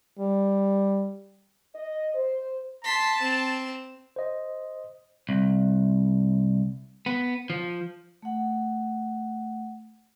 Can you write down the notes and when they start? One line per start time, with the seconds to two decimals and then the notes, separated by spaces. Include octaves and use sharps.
0.19 G3
1.75 D#5
2.15 C5
2.85 A5 C6 B6
3.20 C4 E7
4.16 C5 D#5
5.29 C2
7.06 B3
7.50 F3
8.22 A3 F#5